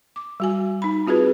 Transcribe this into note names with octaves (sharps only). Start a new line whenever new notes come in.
D6
G3 F#4 G#5
D#4 B5
C4 F4 F#4 G#4 B4